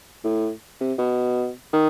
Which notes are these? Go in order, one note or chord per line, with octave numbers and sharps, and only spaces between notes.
A2
C3
B2
D#3